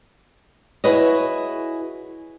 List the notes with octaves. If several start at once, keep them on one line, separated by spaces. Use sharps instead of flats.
E4 F#4 G#4 B4 C#5 D#5